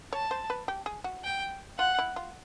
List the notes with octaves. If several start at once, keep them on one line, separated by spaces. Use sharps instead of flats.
C#5 A5
C5
B4
G4
G#4
F#4
G5
F4 F#5
E4
F4